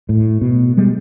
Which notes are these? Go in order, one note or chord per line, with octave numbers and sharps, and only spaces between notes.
A2
B2
G3 G#3 B3